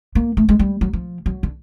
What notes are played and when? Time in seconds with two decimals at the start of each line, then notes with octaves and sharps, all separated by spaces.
0.15 A#3
0.37 A3
0.49 G#3
0.59 G3
0.81 F#3
0.93 F3
1.26 F#3
1.43 D3